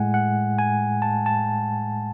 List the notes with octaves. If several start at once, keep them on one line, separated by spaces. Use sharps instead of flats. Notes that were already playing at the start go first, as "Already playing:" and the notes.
Already playing: A2 G#3 F#5 G#5
F#5
G#5
A5
A5